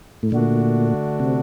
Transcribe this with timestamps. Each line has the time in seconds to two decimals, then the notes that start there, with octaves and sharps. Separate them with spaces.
0.23 A2
0.32 A#2 D3 A3 D4 F#4
1.20 C3